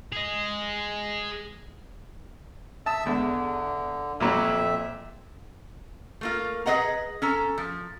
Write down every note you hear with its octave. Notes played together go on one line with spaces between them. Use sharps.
G#4 D#5
E5 A5 D#6 E6
E2 D3 G#3
F2 A#2 F#3 G3 E5
A#2
A3 A#3 F4
G#4 B4 D#5 F#5 A#5
C#4 A4 A#5
F3